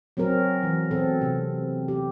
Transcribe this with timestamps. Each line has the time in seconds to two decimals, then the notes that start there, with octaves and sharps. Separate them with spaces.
0.17 F#3 C4 C#4 A#4
0.63 E3
0.91 B2 C4 A4
1.21 C3
1.88 G4